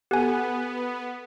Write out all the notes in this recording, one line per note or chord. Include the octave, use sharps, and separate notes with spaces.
B3 G4 A4 F#5 G#5 F#6